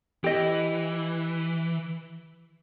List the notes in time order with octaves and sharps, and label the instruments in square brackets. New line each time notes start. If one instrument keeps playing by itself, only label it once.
[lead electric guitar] E3 [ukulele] G4 D#5